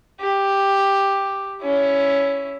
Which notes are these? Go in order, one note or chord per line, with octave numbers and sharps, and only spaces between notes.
G4
C#4 E4